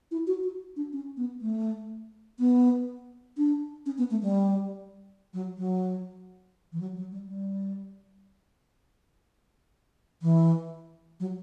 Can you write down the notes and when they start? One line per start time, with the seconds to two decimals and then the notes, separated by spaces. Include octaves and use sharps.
0.11 E4
0.27 F#4
0.43 F#4
0.76 D4
0.93 C#4
1.17 B3
1.41 A3
2.39 B3
3.37 D4
3.86 C#4
3.98 B3
4.11 A3
4.22 G3
5.33 F#3
5.58 F#3
6.72 E3
6.80 F#3
6.97 F#3
7.12 G3
7.28 G3
10.22 E3
11.20 F#3